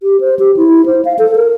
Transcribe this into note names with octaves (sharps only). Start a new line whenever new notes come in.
G4
C5
G4
E4
C5
F5
A4
A#4